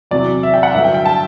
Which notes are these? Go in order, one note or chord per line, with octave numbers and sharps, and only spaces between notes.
E2 C3 F#3 D5
E5
G5
F#5
G2 D3 F#3 E5
G5
G5
A5